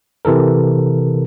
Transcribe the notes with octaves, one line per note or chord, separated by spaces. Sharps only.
C3 E3 A4 A#4